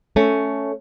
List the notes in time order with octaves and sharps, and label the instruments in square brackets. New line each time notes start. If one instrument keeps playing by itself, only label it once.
[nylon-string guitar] A3 C#4